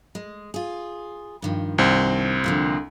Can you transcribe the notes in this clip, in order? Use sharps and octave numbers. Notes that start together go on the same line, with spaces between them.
G#3
F4 G#4
G2 D#3 F3
C2 C4
D3 F3 A#3